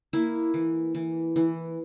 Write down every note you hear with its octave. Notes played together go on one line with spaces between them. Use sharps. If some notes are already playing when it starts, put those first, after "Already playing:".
A#3 E4
E3
E3
E3